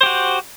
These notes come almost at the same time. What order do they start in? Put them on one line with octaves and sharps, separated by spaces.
C5 G4 F#4